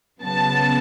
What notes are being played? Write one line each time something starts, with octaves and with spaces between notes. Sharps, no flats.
C#3 F#3 B3 A5